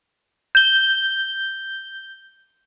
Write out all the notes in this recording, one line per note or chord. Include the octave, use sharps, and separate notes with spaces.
G6 G7